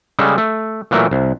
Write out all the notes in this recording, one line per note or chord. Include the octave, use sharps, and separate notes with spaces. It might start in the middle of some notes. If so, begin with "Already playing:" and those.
C#3 G3 G#3 A4
A3
A#2 E3 F#3 A3 A#4
C2